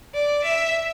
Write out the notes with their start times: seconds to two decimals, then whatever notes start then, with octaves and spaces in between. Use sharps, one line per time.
0.14 D5
0.44 E5